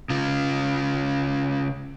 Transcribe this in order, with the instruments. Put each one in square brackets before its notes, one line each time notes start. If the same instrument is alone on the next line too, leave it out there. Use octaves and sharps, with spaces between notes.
[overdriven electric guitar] C#3 F4